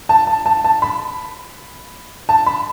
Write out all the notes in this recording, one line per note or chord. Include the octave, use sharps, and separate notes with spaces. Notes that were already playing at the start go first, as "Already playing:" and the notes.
A5
A5
A5
A5
B5
A5
B5